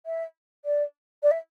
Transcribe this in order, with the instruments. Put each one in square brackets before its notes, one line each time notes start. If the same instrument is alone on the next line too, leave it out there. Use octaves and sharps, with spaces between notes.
[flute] E5
D5
D5
E5